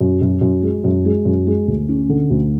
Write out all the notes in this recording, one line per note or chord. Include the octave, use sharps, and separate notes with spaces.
F#2
F#2
F#2
G#3
F#2
G#3
F#2
G#3
D2
C#4
D3
D2